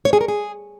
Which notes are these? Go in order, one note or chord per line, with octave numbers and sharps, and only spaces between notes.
C#5
G#4
A#4
G#4